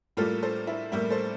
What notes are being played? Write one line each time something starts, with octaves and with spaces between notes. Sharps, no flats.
A2 G3 A#3 F4 A4
A4 C5
E4
A2 G3 A#3 E4
A4 C5